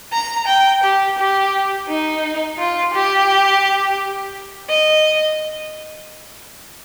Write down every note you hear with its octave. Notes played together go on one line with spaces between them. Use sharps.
A#5
G5
G4
G4
D#4
F4
G4
D#5